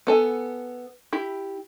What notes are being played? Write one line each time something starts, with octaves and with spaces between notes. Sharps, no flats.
B3 A4 G#5
E4 G4